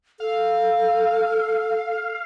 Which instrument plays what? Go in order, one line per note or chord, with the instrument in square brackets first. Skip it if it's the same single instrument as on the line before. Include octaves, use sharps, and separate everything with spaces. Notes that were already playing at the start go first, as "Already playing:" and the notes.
[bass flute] A4 [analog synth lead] F5